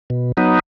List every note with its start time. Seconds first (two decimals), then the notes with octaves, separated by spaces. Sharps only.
0.10 B2
0.37 F#3 B3 D#4